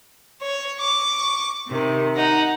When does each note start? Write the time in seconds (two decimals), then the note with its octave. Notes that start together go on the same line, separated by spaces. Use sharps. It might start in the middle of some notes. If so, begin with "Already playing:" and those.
0.41 C#5
0.79 C#6 D6
1.69 C3 D#3
2.16 D#4 F#5